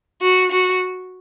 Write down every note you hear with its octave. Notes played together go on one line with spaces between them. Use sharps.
F#4
F#4